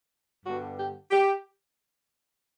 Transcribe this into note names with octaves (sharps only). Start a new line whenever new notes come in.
G2 D3 G3 B3 F#4
G4
G4